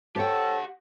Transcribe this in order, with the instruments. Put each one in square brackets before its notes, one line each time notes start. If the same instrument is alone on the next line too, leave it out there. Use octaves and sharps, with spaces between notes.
[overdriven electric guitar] G4 F#5 [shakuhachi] A4 [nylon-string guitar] C5 C#5 G5 [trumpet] A5